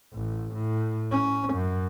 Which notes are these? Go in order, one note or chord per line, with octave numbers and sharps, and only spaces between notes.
A1
A2
C#4
F#2